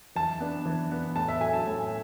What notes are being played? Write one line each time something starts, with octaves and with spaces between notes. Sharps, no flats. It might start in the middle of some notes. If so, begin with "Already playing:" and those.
E3 A5
B3 D4
E3
B3 D4
A2 A5
E5
F#3 A3 G#5
A5
A2